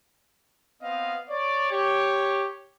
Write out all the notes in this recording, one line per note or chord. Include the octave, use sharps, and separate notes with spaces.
B3 C4 D#5 F5
C#5 D5
G4 C#5